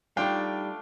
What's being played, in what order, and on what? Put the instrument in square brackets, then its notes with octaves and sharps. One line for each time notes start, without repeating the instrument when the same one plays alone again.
[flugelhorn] G3 [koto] A3 D4 [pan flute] D#4 [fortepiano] F4 F5 G5